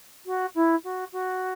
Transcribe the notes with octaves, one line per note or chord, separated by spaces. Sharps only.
F#4
E4
F#4
F#4